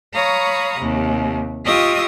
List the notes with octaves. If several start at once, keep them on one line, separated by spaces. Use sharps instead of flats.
C#5 F5 A#5 B5 C#6 D#6
D#2 C3
F4 G4 D#5 C#6 D#6 E6